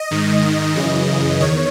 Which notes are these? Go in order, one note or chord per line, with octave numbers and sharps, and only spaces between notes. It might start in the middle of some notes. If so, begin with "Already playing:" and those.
Already playing: D#5
G#2 D#3
F#2 C#3 E3 D#5
E2 D#3 C#5